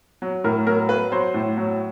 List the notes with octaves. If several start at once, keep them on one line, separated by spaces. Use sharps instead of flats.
F#3
A2 A#4
F#3 A#4
F#3 B4
F#3 C5
A2
F#3